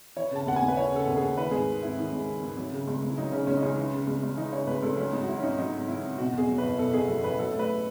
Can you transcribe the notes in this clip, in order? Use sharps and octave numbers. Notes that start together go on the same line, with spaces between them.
E3 C#5
C#3 A5
D#2 F#5
G#5
D#2
B4
E3 C#5
C#3 A4
D#2
G#4
D#2
D#3 B4
G#2 G#4
G#1
G#1 E4
D#3
G#2
G#1
G#1
F#3
C#3
C#2
C#2
E4
F#3 D#4
C#3 C#4
C#2 C#4
D#4
C#2 C#4
E3
C#3
C#2
C#2
E3 D#4
C#3 C#5
C#2 B4
C#2 A4
F#3 C#4
G#2 D#4
F#4
G#1 E4
C#4
G#1 D#4
F#3 D#4
G#2
G#1 E4
G#1
B2 F#4
E2 G#4
F#3
F#1 B4
B2 A4
E2 G#4
F#3 A4
F#1 B4
F#3 A4
A2
B4